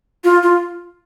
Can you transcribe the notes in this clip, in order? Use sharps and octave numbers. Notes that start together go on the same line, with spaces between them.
F4
F4